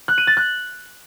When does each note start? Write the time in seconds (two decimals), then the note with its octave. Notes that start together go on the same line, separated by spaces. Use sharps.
0.08 F#6
0.18 D#7
0.27 A6
0.37 F#6